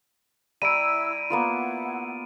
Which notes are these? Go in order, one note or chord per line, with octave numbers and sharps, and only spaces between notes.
G3 E4 G4 A#5 E6 D7 D#7
A#3 B3 E4 F4 F#5